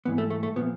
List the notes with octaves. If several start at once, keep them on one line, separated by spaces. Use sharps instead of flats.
G#2 E3 B3
A3
A3
A3
A#2 F3 B3